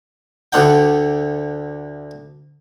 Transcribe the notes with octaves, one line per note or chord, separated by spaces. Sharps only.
D2 D3 D4 F#5 G5